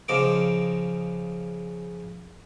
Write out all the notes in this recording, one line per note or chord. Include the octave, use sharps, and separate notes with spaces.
C#3 F3 D#5 D6